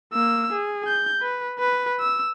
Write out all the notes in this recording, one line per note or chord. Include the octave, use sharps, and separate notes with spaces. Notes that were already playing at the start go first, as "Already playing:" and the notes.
A#3 E6
G#4
G6
B4
B4
E6